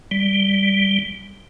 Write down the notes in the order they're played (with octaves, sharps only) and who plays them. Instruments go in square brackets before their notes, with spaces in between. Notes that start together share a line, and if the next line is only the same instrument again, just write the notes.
[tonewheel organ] G3